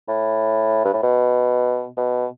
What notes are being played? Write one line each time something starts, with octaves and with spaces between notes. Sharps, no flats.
A2
G2
A2
B2
B2